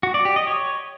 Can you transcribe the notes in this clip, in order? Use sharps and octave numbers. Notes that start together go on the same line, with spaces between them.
F#4
D5
G4
D#5
C#5